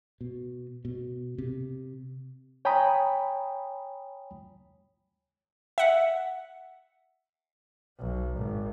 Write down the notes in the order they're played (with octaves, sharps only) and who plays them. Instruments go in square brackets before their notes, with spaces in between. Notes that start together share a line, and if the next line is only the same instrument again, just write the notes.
[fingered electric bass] B2
B2
C3
[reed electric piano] C#5 G5 G#5 A#5 B5 D#6
[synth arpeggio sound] E5 F#5
[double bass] B1
G#1